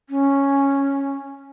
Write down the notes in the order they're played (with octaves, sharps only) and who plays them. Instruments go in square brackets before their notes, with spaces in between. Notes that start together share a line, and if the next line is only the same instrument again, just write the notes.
[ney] C#4